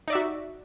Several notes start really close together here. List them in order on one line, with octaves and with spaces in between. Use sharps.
D#4 D5 E5 F#4